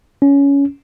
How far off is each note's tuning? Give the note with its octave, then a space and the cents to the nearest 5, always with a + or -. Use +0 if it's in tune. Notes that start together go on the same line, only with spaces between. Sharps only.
C#4 +15